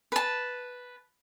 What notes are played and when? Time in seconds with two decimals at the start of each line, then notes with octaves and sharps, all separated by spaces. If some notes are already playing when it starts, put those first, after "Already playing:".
0.12 B4 A5